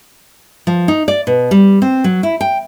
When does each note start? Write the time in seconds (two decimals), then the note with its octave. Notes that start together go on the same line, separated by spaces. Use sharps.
0.67 F3
0.88 D#4
1.08 D5
1.27 B2
1.51 G3
1.82 C4
2.04 F#3
2.23 E4
2.41 G5